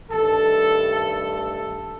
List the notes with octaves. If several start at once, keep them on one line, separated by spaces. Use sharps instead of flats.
G2 D#3 A3 A4
A4
A4